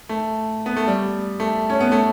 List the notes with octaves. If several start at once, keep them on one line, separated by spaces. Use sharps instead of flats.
A3
B3
A3
G3
A3
C#4
B3
A3